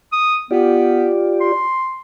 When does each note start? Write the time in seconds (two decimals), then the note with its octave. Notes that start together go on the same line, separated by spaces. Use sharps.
0.12 D#6
0.51 B3 F4 G4 D5
1.41 C6